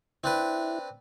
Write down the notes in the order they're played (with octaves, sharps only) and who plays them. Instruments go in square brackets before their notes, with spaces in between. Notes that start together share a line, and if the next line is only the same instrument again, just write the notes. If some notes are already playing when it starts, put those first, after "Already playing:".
[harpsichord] C4 D4 B4 [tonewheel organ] E4